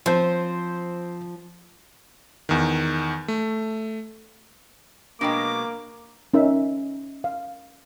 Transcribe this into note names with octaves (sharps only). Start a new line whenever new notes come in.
F3 C4 C5
E2 D#3
A3
B2 F#3 G#3 A#3 D4 G5 D6
C#4 D#4 A#4 E5
F5